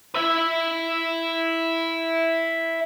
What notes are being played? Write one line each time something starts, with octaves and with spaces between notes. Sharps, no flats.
E4 E5